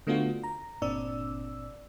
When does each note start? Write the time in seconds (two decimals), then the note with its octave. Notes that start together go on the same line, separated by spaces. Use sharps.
0.07 D3 A3 B3 D4 F4 F#4
0.43 A#5
0.82 G1 A#2 C4 D4 D5 E6